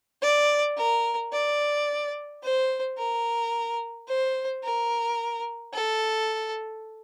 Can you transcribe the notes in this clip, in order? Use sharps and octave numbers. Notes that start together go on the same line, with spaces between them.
D5
A#4
D5
C5
A#4
C5
A#4
A4